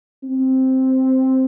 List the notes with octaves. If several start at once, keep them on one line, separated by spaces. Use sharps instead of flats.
C4